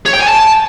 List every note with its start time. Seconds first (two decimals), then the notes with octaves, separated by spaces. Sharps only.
0.06 C#5
0.13 G5
0.20 G#5
0.28 A5